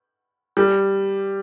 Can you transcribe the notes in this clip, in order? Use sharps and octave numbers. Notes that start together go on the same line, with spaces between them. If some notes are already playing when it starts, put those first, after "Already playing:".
G3